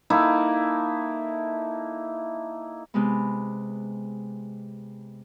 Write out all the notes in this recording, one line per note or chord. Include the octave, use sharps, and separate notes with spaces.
A#3 D#4 E4 A4
C3 G#3 B3